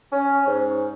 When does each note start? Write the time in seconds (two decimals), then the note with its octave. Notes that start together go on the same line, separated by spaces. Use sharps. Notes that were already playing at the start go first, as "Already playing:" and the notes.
0.12 C#4
0.47 G#2